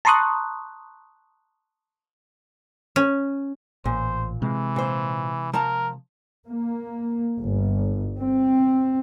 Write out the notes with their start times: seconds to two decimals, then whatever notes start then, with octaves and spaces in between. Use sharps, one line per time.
0.05 A5 A#5 C6 C#6 D#6 F#6
2.96 C#4
3.85 A1 A#2 C5
4.42 C3 E3 G#3
4.76 A#2 C5
5.54 F3 A#4 A5 A#5
6.47 A#3
7.40 G1
8.20 C4